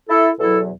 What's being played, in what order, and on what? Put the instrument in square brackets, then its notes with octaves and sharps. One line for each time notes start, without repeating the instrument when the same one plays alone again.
[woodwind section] E4 A4
E2 B2 F#3 E4 A4